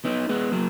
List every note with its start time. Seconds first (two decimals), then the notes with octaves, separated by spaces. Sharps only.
0.05 B3 D#4
0.29 G#3 B3
0.52 F#3 A#3